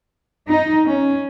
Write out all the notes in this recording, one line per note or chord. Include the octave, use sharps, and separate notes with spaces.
D#4
C#4